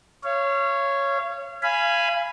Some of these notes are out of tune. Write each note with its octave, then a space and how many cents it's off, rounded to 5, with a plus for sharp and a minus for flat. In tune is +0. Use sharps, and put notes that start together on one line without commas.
C#5 +0 F5 -35
F5 -25 G#5 +0 B5 +0